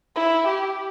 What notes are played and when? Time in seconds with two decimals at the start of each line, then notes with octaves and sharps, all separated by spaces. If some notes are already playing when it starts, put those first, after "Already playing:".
0.15 E4
0.47 G4